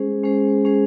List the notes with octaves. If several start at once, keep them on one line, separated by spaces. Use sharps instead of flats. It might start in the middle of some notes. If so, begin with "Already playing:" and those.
Already playing: G#3 C#4 G#4 C5
G#3 C#4 G#4 C5
G#3 C#4 G#4 C5